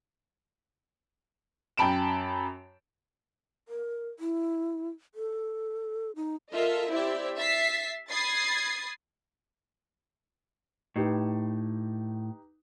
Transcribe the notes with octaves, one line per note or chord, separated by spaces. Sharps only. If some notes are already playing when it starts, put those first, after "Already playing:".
F#2 G5 A5 B5 D7 E7
A#4
E4
A4
D#4
F4 A4 A#4 D#5 E5
C4 E4 G4 D5 E5
E5 A6 B6 C7
B5 D#6 G#6 A6 C7
A2 D#4 G4 B4